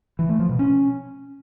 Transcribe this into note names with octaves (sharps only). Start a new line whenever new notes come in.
E3
A3
F3
B2
C#4